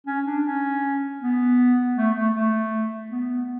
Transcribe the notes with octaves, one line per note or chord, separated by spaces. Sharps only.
C#4
D4
C#4
B3
A3
A3
A3
B3